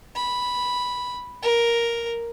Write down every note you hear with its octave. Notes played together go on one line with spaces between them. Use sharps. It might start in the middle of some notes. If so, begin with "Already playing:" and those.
B5
A#4